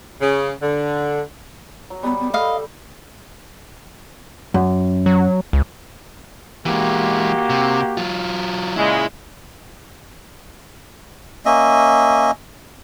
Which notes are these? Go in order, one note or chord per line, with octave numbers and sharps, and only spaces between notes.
C#3
D3
F#3
G3 B3 B5
B3
A4 D#5 F5
F#2
F#3
C#2
E3 G#3 A#3 F#4 G4
C3
F#3 F4
A#2 C#3 G#3 E4
A#3 C#4 D#5 E5